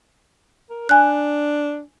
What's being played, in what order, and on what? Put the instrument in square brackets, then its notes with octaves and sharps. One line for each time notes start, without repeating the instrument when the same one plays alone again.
[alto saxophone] A#4
[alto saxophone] D4 [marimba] G#5 F#6